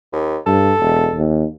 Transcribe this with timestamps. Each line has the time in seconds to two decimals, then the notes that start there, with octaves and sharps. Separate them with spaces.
0.13 D#2
0.47 G2 A4
0.80 E1
1.14 D#2